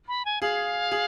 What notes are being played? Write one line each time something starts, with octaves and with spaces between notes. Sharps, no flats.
B5
G#5
G#4 F5
G#4